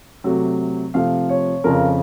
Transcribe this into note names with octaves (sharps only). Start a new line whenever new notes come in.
C3 F#3 A3
C3 F3 A3 F5
C#5
F2 C#3 F3 A#4